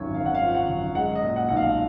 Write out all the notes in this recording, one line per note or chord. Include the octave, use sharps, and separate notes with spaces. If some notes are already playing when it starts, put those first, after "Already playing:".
Already playing: G#1 F#2 F3 C#5
G#1 F5
F#5
F5
F3
F#5
F#2
G#3 F#5
D#5
A#2
F#5
B1 F#5
F5